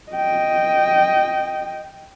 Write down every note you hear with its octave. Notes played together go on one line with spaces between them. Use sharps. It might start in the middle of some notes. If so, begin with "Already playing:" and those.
D#5 G5